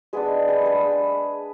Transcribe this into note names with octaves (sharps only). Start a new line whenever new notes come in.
G#3 B3 D4 G#4 B4
G#4 B4
G#3 B3 D4 G#4 B4
G#4